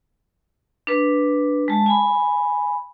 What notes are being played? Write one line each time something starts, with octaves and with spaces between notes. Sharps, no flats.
D4 B4
G#3 A5
G#5 B5